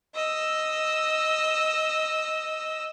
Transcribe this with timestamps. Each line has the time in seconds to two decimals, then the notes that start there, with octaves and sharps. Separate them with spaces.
0.15 D#5 E6